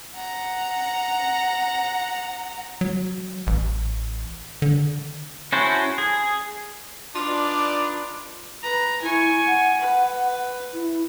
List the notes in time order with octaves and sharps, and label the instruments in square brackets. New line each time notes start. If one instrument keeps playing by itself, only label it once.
[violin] F#5 A#5
[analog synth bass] F#3
A1
D3
[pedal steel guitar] C#4 E4 F#4 A4 C5
G#4
[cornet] D4 [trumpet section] D#4 B4 D5 [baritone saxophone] F4
[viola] B4 A#5
[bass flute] E4 [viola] G#5 C#6
[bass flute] F#5
[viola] B4
[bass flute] E4